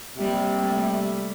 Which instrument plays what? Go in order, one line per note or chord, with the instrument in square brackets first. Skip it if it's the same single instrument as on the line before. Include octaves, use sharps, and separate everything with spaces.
[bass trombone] C3 [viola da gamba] G3 A#3
[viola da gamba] G3 A3